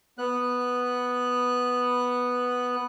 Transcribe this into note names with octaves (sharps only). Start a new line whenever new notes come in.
B3 F#6